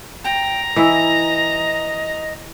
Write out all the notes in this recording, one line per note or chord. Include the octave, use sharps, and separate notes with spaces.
G5 A#5
E3 E4 D#5